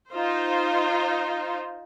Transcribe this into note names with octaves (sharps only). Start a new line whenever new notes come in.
D#4 F4 C5